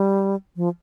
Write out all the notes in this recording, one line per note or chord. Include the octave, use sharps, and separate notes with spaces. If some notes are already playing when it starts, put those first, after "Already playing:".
Already playing: G3
F3